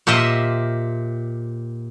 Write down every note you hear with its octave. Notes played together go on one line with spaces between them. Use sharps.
A#2 G4 C5 D#5 E5